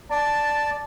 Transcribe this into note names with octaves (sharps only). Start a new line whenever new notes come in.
D5 A5